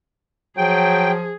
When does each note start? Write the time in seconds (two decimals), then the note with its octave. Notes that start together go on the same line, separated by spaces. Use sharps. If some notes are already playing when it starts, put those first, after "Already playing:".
0.57 F3 F#3 G#4 G5